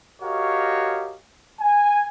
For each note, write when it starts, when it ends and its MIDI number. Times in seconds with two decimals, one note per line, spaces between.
0.22 1.15 66
0.22 1.15 67
0.22 1.15 70
0.22 1.15 73
0.22 1.15 75
0.22 1.15 77
1.61 2.07 80